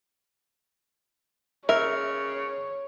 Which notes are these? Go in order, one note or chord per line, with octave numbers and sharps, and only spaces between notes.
C#3 A#4 C#5 E5